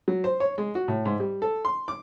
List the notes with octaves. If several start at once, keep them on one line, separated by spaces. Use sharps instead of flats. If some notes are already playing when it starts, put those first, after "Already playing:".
F#3
C5
C#5
G#3
F#4
A2
G#2
G3
A4
C6
D6